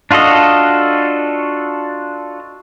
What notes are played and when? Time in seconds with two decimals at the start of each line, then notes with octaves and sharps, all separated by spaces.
0.11 D4 F4 F#4 A4 D#5